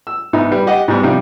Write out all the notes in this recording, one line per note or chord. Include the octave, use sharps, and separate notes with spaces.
E6
G#2 B3 D#4 E4
G3 B4
G4 D#5 F#5
G#2 G3 B3
C3 F3 G3 D#4